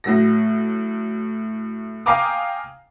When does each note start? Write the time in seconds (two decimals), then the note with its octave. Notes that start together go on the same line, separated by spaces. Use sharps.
0.04 A2 F#3 A#6
2.06 F5 G5 G#5 A#5 D6 D#6